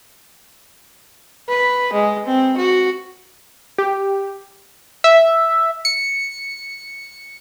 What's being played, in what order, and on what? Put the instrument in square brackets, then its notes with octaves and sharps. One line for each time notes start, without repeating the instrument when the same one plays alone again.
[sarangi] B4
G#3
C4
F#4
[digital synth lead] G4
[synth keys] E5
C#7